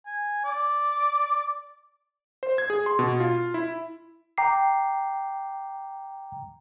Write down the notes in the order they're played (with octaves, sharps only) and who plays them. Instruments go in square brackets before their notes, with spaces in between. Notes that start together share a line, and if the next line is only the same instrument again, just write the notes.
[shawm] G#5
D5
[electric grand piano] C5
G#6
G#4
C6
B2
F4
E4
[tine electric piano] G5 A#5 D6 C7